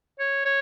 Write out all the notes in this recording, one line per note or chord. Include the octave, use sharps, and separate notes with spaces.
C#5
C#5